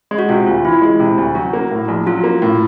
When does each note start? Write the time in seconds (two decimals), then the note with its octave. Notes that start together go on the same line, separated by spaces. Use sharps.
0.11 G#3
0.19 F#4
0.29 C3 F4
0.46 D2 F4
0.65 E3 E4
0.82 G#3
0.99 C3
1.18 D2
1.35 F#3 F#4
1.53 A#3
1.71 A2
1.88 A#1
2.06 F#3 F4
2.24 A#3
2.42 A2